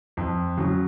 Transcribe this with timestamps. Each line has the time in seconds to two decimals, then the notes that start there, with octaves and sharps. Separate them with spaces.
0.17 F2
0.58 C#3 F#3